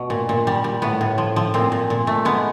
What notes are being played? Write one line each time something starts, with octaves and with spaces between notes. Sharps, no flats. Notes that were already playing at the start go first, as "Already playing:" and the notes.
Already playing: B2
A#2
A#2
G3
G3
A2 B3
A2
F3
F3
A#2 C4
A#2
A#2
A3
G#3 B3